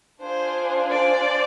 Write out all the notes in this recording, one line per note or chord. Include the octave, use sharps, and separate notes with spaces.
D4 F4 G#4 C5
C5 D5